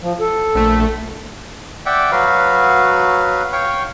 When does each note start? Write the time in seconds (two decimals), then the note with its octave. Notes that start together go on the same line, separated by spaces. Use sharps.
0.02 F3
0.20 A4
0.55 A#1 A3
1.86 D5 E5 F#5 G5
2.12 F#3 F#4 B4 F5
3.53 C#5 F5 G5 C#6